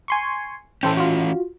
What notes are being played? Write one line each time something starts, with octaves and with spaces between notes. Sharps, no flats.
G#5 C6 C#6
E3 C#4 A4 C5 G5
F4 F#4